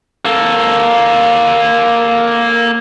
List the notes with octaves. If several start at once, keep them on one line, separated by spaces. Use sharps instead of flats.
A#3 A4